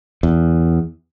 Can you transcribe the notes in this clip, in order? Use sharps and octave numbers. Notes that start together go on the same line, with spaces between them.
E2